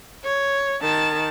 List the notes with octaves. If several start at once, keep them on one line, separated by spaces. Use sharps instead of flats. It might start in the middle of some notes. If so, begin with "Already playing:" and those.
C#5
D#3 A5